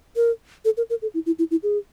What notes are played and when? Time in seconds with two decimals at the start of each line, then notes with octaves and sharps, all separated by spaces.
0.16 A#4
0.65 A4
0.77 A#4
0.90 A#4
1.02 A4
1.14 E4
1.26 E4
1.39 E4
1.51 E4
1.63 G#4